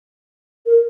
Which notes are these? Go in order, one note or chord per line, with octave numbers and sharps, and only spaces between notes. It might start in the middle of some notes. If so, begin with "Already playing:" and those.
A#4